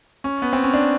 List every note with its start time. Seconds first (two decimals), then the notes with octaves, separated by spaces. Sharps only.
0.24 C#4
0.42 B3
0.53 C4
0.63 C#4
0.74 D4